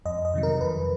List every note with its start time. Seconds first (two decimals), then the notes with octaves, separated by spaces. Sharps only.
0.05 F2 D#5
0.25 D#5
0.34 C3 D#3 F#3
0.43 A#4
0.61 F2 B4